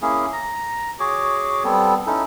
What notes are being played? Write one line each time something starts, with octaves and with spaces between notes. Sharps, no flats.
A#3 C#4 E4 G#4
A#5
F#4 G#4 C#5 D6
G3 B3 C4 A4
C#4 D#4 E4 A4